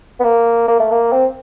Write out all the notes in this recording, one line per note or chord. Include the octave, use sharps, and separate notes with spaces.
B3
A#3
A#3
A3
A#3
C4